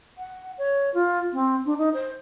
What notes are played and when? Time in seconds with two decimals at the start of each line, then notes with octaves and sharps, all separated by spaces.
0.18 F#5
0.58 C#5
0.94 F4
1.33 C4
1.65 D4
1.78 D#4
1.94 C5